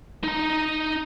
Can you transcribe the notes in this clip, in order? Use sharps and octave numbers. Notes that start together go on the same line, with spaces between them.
D#4 A#5